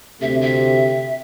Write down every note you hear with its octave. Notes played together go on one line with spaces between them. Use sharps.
D2 C3 A3 C4 G4 E5
E5